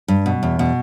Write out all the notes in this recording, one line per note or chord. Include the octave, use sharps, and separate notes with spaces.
G2
B2
E2
B2